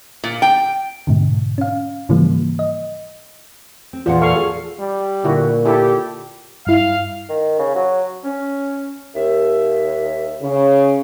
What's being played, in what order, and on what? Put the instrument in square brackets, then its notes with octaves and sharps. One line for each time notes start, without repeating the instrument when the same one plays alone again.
[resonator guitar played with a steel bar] A#2
G5
[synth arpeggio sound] G#2 B2 D3
C#4 F5
G#2 C#3 E3 F3 G3 A#3
D#5
[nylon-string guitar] C4
[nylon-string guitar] E2 A#2 F#5 [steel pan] F4
[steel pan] A4 F5 C#6
[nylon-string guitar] G#4
[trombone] G3
[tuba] A#2 [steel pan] D3 E4 F#4
[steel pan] E4 A4 [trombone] G4
[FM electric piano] G2 E4 [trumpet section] F5
[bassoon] D#3
C#3
F#3
[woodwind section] C#4
D#2 E5
[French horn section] C#3